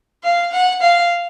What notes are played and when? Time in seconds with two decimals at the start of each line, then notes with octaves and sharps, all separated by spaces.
0.24 F5
0.52 F#5
0.82 F5